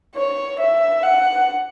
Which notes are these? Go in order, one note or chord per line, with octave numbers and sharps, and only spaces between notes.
C#5
E5
F#5